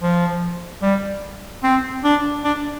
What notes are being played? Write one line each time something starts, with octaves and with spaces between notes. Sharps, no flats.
F3
G3
C4
D4
D4